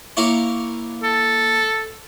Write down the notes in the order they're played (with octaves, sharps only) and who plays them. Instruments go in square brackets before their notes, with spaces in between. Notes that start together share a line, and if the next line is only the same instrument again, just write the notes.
[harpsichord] A#3 E4 C#5
[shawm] A4